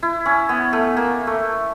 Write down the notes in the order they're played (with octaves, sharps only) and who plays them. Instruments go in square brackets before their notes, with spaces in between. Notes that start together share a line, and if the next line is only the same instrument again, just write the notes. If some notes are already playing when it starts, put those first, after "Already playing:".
[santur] E4
C#4
B3
A3
A#3
A3